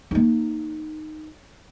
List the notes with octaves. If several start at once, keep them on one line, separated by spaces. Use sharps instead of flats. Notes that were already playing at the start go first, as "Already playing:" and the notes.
A#3 D#4